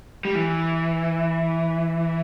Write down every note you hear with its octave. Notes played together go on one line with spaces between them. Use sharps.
G3
E3